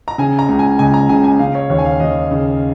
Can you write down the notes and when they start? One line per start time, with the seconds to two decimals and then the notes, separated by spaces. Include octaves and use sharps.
0.08 A#5
0.18 C#3 G#5
0.39 A#5
0.49 C#2
0.59 G#5
0.79 C#2 G#5
0.94 A#5
1.09 C#3 G#5
1.24 G#5
1.39 C#3 F5
1.55 C#5
1.70 D#2 C#5
1.78 G#5
1.85 F5
2.00 D#2 D#5
2.31 C#3